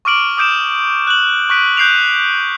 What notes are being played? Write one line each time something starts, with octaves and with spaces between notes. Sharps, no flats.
C#6 D6 F6 D7 F#7
D6 D#6 G6 D7 E7
F#6 F#7
C#6 F#6 B6 D7
F#6 G6 C7 D7 F7